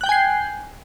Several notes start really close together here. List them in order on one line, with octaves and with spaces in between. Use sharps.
F#6 G5 G6 G#5 C7